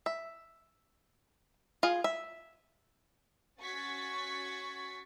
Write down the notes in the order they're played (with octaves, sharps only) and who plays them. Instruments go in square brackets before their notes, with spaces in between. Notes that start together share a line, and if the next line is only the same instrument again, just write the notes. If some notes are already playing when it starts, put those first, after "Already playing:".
[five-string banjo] E5
F4 G#4
E5
[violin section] C#4 F#4 C#6 G#6 A6 B6